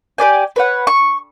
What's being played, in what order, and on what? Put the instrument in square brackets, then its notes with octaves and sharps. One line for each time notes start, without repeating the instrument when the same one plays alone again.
[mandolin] G4 B4 D5 G#5
B4 C#5 F#5
C#6